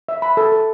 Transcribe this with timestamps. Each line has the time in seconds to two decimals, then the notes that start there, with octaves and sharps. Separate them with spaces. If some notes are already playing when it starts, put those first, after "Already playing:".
0.09 E5
0.22 B5
0.37 A4
0.52 A4